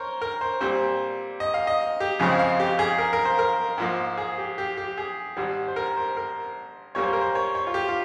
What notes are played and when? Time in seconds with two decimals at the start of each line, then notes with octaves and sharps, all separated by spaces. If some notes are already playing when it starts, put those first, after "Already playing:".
Already playing: A#4 C5 C#5
0.21 A#4
0.41 C5
0.61 A#2 G3 C4 C5
1.40 D#5
1.54 F5
1.67 D#5
2.00 G4
2.19 F2 C#3 G#3 C4 G#4
2.39 F5
2.60 G4
2.79 G#4
2.98 A#4
3.13 A#4
3.25 C5
3.39 A#4
3.78 G#2 F3 A#3
4.18 G#4
4.38 G4
4.58 G4
4.77 G4
4.98 G#4
5.37 G#1 G#2 G3
5.68 C5
5.76 A#4
5.97 C5
6.17 A#4
6.95 A#2 G3 A#3 C#5
7.04 C5
7.13 A#4
7.21 C5
7.35 C#5
7.55 C#5
7.67 F4
7.74 G4
7.88 F4